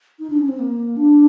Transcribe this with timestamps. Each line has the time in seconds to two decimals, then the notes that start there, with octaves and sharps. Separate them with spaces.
0.20 D#4
0.30 D4
0.39 C#4
0.49 C4
0.59 A#3
0.97 D4